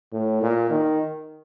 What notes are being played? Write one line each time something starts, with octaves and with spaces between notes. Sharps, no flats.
A2
A#2
D#3